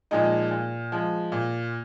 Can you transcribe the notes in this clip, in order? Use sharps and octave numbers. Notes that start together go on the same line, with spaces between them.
A#2 F3 G#3 D#4
A#2
F3 G#3
A#2